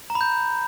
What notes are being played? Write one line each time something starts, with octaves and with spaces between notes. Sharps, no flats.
A#5
B5
G6